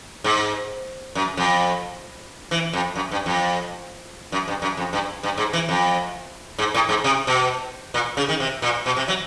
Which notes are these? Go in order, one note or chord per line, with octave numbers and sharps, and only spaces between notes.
G#2
F#2
F2
E3
F2
F#2
G2
F2
F#2
G2
F#2
F2
G2
G2
G#2
E3
F2
G#2
A2
G#2
C3
B2
A#2
C#3
D#3
C3
A#2
B2
C3
F#3